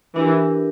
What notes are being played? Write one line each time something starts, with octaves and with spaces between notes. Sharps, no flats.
E3 D4 G4 A#4